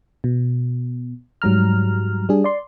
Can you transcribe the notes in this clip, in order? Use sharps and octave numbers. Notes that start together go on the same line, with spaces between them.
B2
G#2 F#3 G3 A#5 F6
G3 D4 G#4
D5 C6